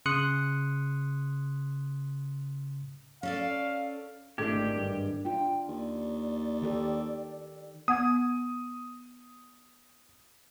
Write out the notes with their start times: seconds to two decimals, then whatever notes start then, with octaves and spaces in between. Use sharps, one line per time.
0.06 C#3 C6 D#6 F#6 C#7
3.23 C#4 A4 D5 F5
4.38 G#1 A3 D4 E4 G4 A4 G#6
4.76 G2
5.25 D4 F4 G5
5.68 D#2 D5
6.62 D#3 G4 A4
7.88 B3 F#5 D#6 G#6